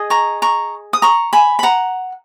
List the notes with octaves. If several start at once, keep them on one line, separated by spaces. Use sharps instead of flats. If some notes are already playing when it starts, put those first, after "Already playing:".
Already playing: G#4 D#5
A#5 C#6
A#5 C#6
D#6
A#5 C#6
G#5 B5
B5
F#5 A#5